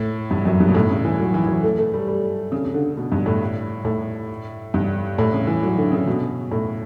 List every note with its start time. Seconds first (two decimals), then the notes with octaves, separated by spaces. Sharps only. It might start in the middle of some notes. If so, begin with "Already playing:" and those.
Already playing: A2
0.31 G2
0.45 F#2
0.60 G2
0.69 B2
0.74 A2
0.90 C#3
1.05 E3
1.20 F#3
1.34 E3
1.45 E3
1.48 F#3
1.63 A3
1.78 A3
1.93 G3
2.08 G3
2.52 C#3
2.65 C#3
2.74 D3
2.97 B2
3.12 G2
3.26 A2
3.85 A2
4.74 G2
5.18 A2
5.33 C#3
5.47 E3
5.63 F#3
5.78 D3
5.92 C#3
6.07 B2
6.51 A2